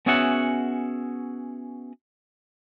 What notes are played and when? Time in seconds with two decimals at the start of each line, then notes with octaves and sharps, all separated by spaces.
0.06 B3 C#4 F#4 G#4 E5 F#5